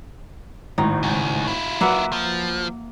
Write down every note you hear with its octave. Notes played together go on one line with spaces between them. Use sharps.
G#1 A2 D#3 D#4
C#2
E4 F4
F#3 A#3 B4 E5 F#5
F3